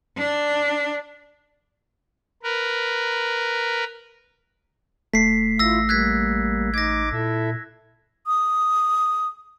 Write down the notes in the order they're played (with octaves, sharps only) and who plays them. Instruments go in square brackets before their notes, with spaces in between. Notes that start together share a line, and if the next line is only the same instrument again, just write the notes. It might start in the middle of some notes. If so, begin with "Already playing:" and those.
[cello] D4
[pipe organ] A#4 B4
[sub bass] D#1 [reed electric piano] A3 [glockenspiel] B6 C7
[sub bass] A1 [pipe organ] E4 F4 [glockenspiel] E6 A#6
[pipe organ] G3 A#3 [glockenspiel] F#6 G#6 B6
[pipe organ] D#4 D6 [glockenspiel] G#6 A#6
[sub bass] A#2 [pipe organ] E4 A4 E5
[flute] D#6